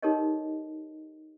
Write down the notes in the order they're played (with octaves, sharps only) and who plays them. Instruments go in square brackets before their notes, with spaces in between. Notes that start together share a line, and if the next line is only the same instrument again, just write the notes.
[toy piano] D#4 G4 A4 A#4 C#5 D#5